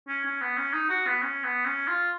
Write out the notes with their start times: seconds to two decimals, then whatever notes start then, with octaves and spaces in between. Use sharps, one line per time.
0.08 C#4
0.25 C#4
0.41 B3
0.57 C#4
0.73 D#4
0.90 F#4
1.07 B3
1.22 C#4
1.44 B3
1.65 C#4
1.88 F4